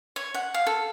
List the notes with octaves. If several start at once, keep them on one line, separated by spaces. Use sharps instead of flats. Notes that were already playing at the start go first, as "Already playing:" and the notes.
C#5
F#5
F5
A4